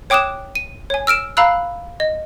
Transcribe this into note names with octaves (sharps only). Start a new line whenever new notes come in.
C#5 G5 D6 D#6 F#6 E7
D#7
C#5 G#5
E6 F6 D7 E7
F5 A#5 B5 E6 F#6
D#5